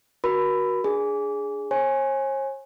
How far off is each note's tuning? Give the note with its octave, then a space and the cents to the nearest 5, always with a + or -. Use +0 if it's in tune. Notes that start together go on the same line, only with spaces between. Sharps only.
F#4 +0 A#4 +40 B5 +15
D4 -5 G#4 +0
C#5 -45 G#5 +0